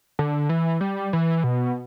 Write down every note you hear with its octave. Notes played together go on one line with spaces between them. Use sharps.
D3
E3
G3
E3
B2